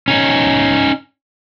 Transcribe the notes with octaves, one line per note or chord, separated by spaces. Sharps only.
C#4 D#4